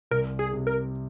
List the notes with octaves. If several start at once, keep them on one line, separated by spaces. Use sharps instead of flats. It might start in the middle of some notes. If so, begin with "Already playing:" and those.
C2 A#4
G#4
C3
A#4